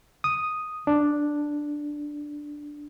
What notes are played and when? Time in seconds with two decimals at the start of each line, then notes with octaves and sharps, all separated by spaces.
0.24 D#6
0.87 D4